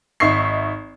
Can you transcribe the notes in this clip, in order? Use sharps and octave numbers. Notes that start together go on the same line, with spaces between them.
G#1 D#4 E5 C#6 C7